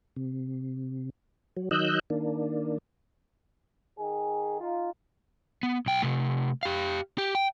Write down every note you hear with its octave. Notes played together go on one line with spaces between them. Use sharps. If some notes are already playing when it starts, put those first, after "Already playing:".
C3
F#3
D#3 F#3 D#5 E6 F#6 G6
D#3 A#3 D4
D#3 G#4
D#4 F4
B3
B1 G5
C3 A3
G4 F5
G4
G5